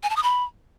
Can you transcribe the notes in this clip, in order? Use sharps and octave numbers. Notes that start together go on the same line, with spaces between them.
G#5
A5
D#6
B5